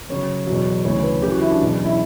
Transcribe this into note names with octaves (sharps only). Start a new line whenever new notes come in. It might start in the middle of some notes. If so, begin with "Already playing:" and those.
F#2 C#3 F#3 C#5
E2 B2 F#3
D2 C#3 E3 C#5
B4
F#2 E3 G4
F#4
E4
D4
E2 B2 F#3
C#4
E4